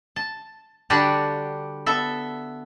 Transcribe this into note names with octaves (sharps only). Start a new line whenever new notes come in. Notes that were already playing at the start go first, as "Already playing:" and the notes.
A5
D3 G3 D4 F#4 G4 A5
B3 A4 E5